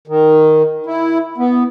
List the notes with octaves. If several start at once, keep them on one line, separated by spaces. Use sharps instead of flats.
D#3
E4
B3